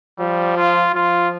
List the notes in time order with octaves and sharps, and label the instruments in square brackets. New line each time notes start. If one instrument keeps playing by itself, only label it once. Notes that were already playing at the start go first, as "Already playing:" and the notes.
[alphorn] F3 [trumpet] G3
[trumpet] F4
[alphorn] F3 [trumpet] F4